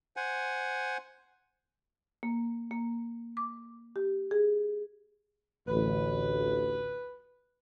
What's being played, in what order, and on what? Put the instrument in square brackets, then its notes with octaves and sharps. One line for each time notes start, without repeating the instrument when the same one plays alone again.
[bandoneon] C5 F#5 G#5
[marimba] A#3
A#3
D6
G4
G#4
[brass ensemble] A1 D2 [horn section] B4